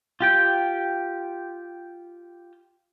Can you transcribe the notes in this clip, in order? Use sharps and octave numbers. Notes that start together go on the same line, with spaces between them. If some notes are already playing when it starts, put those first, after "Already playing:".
F4 G4 G5